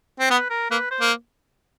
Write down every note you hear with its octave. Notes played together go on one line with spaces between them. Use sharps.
C4
B3 B4
A#4
A#3 B4
C5
A#3